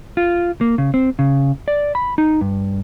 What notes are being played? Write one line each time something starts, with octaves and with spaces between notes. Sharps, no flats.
F4
A#3
C#3
C4
C#3
D5
B5
D#4
G2